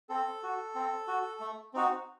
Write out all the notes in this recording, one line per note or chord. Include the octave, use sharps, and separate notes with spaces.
C4 A4
F#4
C4
F#4
A3
C4 D#4 F#4